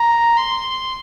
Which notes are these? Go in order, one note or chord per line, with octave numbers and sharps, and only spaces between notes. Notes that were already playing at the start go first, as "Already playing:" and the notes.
Already playing: A#5
C6